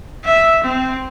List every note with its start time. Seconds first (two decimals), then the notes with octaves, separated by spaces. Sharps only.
0.25 E5
0.64 C4